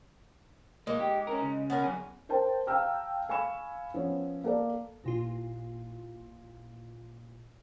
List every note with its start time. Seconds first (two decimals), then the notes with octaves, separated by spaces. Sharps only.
0.87 G#3 A#3 D#4
1.00 G4
1.27 C#4 A#4
1.41 C#3
1.70 B3 C#4 A#4
1.84 F#2 G#4
2.29 A#4 C5 G5 A5
2.67 F5 G5 A5 A#5 E6 F6
3.29 F5 G#5 B5 C#6 C#7 E7
3.94 F3 B3 C#4
4.44 A#3 A4 D5
5.04 A1 A#2 F4